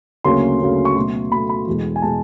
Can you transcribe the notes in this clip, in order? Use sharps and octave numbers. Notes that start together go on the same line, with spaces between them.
D2 C#3 F#3 A#3 C#4 C6
D2 C#3 F#3 A#3 C#4
C#6
B2 F#3 A3 C6
B2 F#3 A3 B5
B5
E2 B2 G#3
G#5
B2 G#3 A5